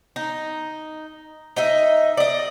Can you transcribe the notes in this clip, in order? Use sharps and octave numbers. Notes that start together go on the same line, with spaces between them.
D#4
D#4 D#5 E5
D5 D#5